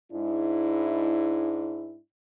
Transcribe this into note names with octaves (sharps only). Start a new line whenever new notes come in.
G#2 G#3 D4 E4